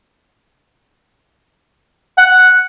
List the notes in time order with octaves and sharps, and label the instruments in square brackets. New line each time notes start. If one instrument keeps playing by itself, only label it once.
[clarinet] F#5